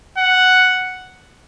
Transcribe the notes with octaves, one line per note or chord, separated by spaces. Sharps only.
F#5